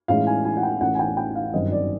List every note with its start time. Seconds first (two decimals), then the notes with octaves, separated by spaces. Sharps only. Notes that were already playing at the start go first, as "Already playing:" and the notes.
0.08 A2 E3 G#3 C#4 F5
0.27 G#5
0.45 G#5
0.57 F#5
0.63 G5
0.81 A1 A2 E3 A3 C#4 F#5
0.95 G#5
0.99 G5
1.17 G5
1.35 F5
1.53 G1 F#2 D#3 G3 C4 D#5
1.72 D5